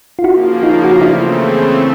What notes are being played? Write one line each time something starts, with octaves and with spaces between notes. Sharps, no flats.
F4
C#3 F3 A#3 E4 F#4
D#4 F4
F#4
F4
C#3 E3 A3 C4 D4 E4